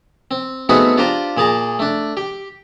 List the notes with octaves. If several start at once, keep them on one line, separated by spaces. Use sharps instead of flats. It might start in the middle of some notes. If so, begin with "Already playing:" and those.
C4
A3 B3 C4 D#4 F#4 G#4
D4 F4 G4 C5 A#5
A#2 G#4 A5 A#5
A3 D4
G4